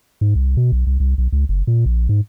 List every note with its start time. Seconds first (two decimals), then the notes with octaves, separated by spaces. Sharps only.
0.21 G#2
0.36 C2
0.57 B2
0.72 B1
0.87 C2
1.00 C2
1.18 B1
1.32 C#2
1.49 F#1
1.67 A#2
1.86 A#1
2.09 G#2